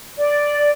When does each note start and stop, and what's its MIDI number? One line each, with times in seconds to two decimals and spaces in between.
0.18 0.71 74